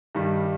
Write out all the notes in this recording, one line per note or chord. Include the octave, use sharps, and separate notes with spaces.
G2 D#3 G3